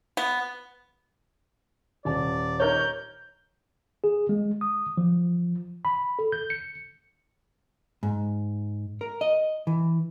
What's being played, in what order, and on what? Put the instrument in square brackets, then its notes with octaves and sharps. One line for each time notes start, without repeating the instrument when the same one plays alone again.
[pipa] B3
[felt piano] D#1 A5 [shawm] D5
[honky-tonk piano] D#4 A#4 C#5 [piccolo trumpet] G6
[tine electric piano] G#4
G#3
D#6
F3
B5
A4
G6
C#7
[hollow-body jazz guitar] G#2
A#4
D#5
E3